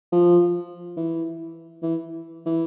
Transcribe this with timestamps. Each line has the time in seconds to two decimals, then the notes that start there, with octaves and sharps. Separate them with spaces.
0.12 F3
0.97 E3
1.82 E3
2.46 E3